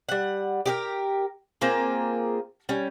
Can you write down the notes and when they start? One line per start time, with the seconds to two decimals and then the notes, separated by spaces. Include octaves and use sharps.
0.09 G3 F#5
0.66 G4 G#4 A#4
1.61 A#3 C4 F4 G#4
2.69 G3 C#4